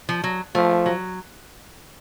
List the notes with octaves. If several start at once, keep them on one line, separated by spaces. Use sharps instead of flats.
F3
F#3
F3 A3
F#3